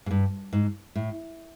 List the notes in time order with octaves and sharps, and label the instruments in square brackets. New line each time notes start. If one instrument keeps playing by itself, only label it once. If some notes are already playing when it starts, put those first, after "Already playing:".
[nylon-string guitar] G#2
G2
G#2
A2